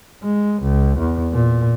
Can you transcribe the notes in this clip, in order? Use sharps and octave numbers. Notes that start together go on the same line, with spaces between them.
G#3
C#2
E2
A#2